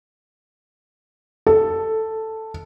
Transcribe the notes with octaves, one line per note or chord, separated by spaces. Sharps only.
A4